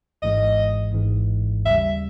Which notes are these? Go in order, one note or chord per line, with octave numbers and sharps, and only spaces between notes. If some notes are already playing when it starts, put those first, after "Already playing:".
G#1 G#2 E3 G#3 D#5
G#1 G#2 E3 G#3
D#2 C#3 G3 E5